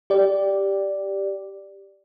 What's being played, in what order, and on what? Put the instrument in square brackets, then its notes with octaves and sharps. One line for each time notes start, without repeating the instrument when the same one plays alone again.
[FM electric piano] G4 D5